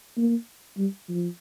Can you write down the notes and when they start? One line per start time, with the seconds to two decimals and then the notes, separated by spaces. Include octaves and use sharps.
0.17 A#3
0.78 G3
1.08 F3